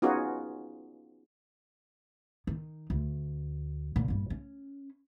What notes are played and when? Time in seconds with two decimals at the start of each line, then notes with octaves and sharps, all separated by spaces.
0.02 B3 C#4 D#4 F4 F#4 G#4
2.47 D#3
2.90 D2
3.96 A#2 C#3
4.08 A#1 G2
4.30 C#4